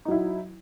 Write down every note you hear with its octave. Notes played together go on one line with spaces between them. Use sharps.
F#3 D#4 E4